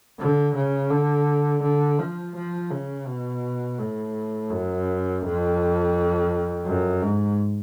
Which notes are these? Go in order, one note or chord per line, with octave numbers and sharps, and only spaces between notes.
D3
C#3
D3
D3
F3
F3
C#3
B2
A2
F#2
F2
F#2
G#2